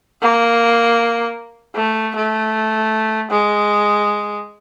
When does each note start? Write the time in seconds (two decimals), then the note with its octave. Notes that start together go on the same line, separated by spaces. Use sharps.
0.21 A#3
1.76 A3
2.15 A3
3.31 G#3